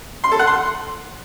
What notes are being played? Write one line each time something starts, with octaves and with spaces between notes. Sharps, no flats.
C6
A4
F#5
C6